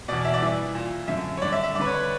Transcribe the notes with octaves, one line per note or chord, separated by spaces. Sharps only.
E2 B2 D5
E5
D5
G2 E3 E5
A#2
F#2 D3 E5
C#5
G2 D3 D5
E5
E5
G2 D3 B4 D5
C#5